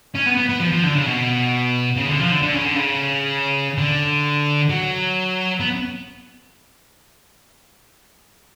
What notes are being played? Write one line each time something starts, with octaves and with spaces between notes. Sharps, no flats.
C#4
B3
B3
B3
F3
F3
D3
C#3
B2
C#3
D3
F3
D3
D3
C#3
D3
C#3
D3
F#3
B3